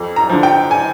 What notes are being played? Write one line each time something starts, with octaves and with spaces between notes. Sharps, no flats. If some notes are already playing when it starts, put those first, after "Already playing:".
Already playing: F2
A#5
D3 F3
G5
G#5